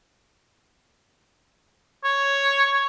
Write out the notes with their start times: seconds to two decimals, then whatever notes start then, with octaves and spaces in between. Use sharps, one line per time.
2.04 C#5